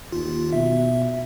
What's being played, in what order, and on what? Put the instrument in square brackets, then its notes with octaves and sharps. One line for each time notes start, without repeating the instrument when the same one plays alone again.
[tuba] D#2 [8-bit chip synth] F4
[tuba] B2 [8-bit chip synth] E5